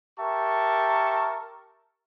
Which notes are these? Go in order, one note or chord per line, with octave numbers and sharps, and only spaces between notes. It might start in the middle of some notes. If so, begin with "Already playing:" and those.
G4 A#4 E5 A5 C#6